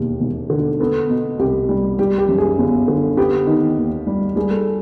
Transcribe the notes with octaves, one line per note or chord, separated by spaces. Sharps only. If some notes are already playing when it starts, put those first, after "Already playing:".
Already playing: E1 D#2 G4
E1
D3
B3 A4
B2
C2 G4
G3
G3 G4
G4
F#2
G#4
G1
D3
B3 G4
D#3
D#2
G3
G3 G#4
A4